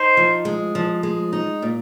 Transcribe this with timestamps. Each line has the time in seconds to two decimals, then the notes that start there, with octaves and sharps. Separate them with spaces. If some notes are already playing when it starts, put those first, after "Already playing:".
Already playing: D#4 C5
0.17 F3
0.45 G#3
0.75 F3
1.03 G#3
1.33 D#4
1.62 A#2